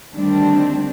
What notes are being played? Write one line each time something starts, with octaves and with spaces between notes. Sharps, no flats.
D2 D#3 G3 C4 D4